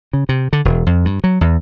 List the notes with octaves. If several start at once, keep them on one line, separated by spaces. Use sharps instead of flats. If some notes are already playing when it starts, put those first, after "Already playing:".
C#3
C3
D3
E1
F2
G2
F#3
E2